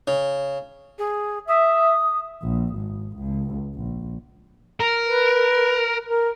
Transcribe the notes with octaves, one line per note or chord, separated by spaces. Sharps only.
C#3
G#4
E5 D#6
A#1
G#1
C#2
A#1
A#4
B4
A#4